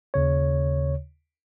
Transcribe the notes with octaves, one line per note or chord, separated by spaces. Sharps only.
D#2 C#3 C#5